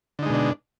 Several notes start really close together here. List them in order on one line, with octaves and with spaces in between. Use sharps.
D3 D#4 G#3 B2 D4